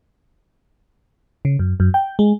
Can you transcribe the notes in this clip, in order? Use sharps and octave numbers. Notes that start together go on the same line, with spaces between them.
C#3
F#2
F#2
G5
G#3